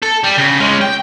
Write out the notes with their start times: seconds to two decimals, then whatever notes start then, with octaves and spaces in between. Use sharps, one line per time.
0.02 A4
0.23 G3
0.38 C#3
0.60 G#3 C#4
0.81 G5